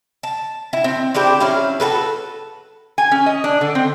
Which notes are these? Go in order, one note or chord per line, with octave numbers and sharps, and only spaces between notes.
A5
E4
C4
C4 D4 E4 G4
F#3 C#4 E4 F5
F#4 G#4 A4 B4
G#5
C#4
D#5
D4
D3
C4